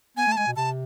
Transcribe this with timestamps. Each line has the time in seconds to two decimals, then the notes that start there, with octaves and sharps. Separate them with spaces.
0.17 B3 G#5
0.27 A3 A5
0.37 G#3 G#5
0.47 B2
0.56 C3 A5